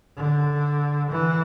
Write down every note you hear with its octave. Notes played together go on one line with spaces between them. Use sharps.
D3
E3